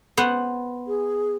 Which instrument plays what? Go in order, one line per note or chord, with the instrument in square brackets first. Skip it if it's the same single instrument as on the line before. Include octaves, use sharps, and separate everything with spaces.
[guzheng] B3 C5 F#5
[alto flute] G#4